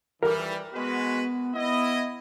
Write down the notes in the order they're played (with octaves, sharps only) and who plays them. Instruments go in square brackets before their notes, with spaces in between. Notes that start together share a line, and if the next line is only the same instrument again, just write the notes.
[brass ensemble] E3 G3 [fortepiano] A#4
[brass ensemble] G#3 F#4 B4 [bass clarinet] B3
[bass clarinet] B3 [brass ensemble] E4 D#5